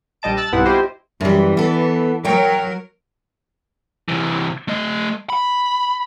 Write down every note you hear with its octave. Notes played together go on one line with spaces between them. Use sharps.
A#1 G3 D#5 A5 D7
A5 E6 F#6 A6
B1 G2 B3 C4 E4 F#5
E4 F4 G4 C5 D#5
F#2 E3 G3
B3 A4
F#3 A#4 C#5 G5
C3 E3
A3 D#5
B5